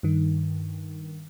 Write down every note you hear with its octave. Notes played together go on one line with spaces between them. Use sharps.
G2 D#3